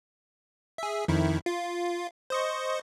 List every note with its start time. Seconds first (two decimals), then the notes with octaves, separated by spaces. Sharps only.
0.78 G#4 E5
1.08 F2 D#3 E4
1.46 F4
2.30 C5 D#5 C#6